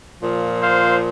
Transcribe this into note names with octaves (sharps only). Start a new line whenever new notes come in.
A#2 F3
C5 F5